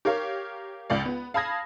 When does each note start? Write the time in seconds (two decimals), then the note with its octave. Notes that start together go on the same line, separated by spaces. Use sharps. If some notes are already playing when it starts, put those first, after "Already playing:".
0.05 G4 A#4 C#5 F5
0.90 C#2 D5 F5
1.05 B3
1.34 F5 A5 B5 D#6 G#6 A#6